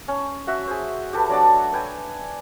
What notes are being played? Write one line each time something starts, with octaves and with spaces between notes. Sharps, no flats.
C#4
F#4 E5 F#5
G#4 C5
G4 A4 B4
F#3 D4 D5 F#5
B4 G5 G#5